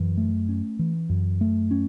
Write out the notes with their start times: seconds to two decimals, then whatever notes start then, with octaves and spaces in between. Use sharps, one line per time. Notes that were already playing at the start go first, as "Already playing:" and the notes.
Already playing: F#2 E3
0.18 A3
0.49 C#4
0.79 E3
1.09 F#2
1.41 A3
1.71 C#4